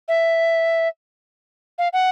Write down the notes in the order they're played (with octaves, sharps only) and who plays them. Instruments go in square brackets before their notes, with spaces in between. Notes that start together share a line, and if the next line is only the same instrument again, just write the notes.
[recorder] E5
F5
F#5